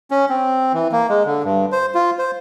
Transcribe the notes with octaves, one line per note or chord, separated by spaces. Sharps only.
C#4
C4
E3
A#3
G#3
D3
G2
C5
F4
C5